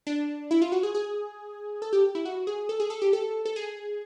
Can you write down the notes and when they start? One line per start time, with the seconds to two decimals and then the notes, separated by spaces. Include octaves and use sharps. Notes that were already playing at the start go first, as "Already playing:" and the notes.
0.07 D4
0.51 E4
0.62 F4
0.72 F#4
0.83 G#4
0.95 G#4
1.82 A4
1.93 G4
2.15 E4
2.25 F#4
2.47 G#4
2.69 A4
2.80 G#4
2.90 A4
3.02 G4
3.13 A4
3.45 A4
3.56 G#4